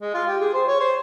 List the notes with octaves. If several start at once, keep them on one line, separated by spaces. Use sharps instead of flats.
G#3
F4
G4
G#4
C5
C#5
C5